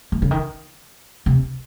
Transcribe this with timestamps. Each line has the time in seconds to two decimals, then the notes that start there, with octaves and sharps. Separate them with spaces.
0.12 E3
0.22 C#3
0.31 D#3
1.26 C3